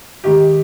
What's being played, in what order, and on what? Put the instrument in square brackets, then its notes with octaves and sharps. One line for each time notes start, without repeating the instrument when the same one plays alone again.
[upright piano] C3 D#3 G#3 G4